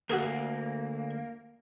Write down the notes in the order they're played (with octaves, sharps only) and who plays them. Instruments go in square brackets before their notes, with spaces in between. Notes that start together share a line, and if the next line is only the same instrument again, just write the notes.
[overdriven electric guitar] D2 [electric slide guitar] A#3 [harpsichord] F#4 G#4 A#4